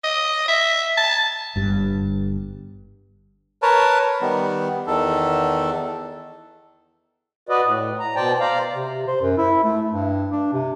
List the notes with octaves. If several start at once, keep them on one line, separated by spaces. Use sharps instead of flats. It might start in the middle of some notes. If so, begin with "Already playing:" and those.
D#5
E5
A5
G1 G2
A#4 B4 C#5 A5
D#3 G3 B3
E2 D#3 A4
F#4 B4 D5 D#5
A2
A#5
B2 C5 D5 G5 A5
C5 D5 F5 A#5
C3
C5
F#2
E4
A3
G2
D4
C3